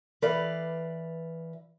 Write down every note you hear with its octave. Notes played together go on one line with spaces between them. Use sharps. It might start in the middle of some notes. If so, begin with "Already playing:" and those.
E3 B4 D5 F5